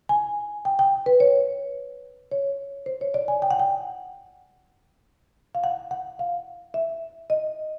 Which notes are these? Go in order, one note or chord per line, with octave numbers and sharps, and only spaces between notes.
G#5
G5
G5
B4
C#5
C#5
C5
C#5
D5
G#5
G5
F#5
G5
F5
F#5
F#5
F5
E5
D#5